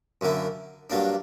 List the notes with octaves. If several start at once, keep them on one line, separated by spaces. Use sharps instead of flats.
F#2 D3 A#3 E4
G2 F#3 A#3 D4